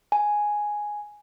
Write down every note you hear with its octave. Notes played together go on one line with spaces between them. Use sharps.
G#5